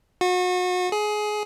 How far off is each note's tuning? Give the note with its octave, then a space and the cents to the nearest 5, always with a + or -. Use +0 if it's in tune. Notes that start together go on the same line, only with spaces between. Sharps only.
F#4 -35
G#4 +20